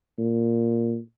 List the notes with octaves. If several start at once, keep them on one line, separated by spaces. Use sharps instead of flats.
A#2